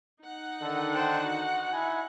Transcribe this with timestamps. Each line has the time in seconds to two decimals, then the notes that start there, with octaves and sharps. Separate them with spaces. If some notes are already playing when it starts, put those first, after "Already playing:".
0.23 D#4 F#5
0.62 D3 D#3 A4
0.95 C5 G5 A5
1.25 F#4
1.73 E4 G#5